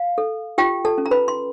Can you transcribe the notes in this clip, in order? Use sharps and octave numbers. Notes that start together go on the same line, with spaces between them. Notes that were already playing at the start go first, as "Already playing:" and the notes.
Already playing: F5
A4
F4 G4 G5
A4 A5
C#4
A#5
B4 B5
C6